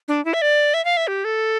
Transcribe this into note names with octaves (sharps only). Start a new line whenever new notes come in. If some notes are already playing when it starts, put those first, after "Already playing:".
D4
E4
E5
D5
E5
F5
E5
G4
A4